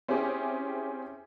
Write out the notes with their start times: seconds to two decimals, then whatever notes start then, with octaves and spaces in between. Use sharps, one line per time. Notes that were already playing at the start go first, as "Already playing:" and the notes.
0.08 C4 C#4 E4 G4 G#4